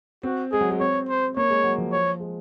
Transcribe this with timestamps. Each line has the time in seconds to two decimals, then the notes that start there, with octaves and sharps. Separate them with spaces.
0.23 C4 F#4
0.52 G#3 G#4
0.61 F#3
0.71 G#3
0.80 C4 C#5
1.08 C5
1.37 A#3 C#5
1.50 G#3
1.64 F#3
1.78 F3
1.92 C#5
2.20 G#3